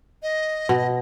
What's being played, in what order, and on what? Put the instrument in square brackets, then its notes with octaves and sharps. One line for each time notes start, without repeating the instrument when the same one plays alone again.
[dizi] D#5
[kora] B2